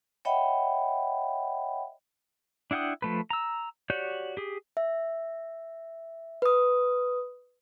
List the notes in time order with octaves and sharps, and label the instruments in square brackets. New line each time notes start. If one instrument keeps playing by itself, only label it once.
[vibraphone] C#5 D#5 E5 F#5 G5 B5
[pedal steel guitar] D4 E4 F#5 G5 D#6
F3 A3 B4
A#5 E6
F#4 G4 C#5 D5 G6
G4 G#4
[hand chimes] E5
B4 D#6